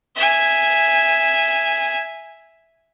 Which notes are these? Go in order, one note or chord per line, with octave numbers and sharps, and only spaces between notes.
E5 G#5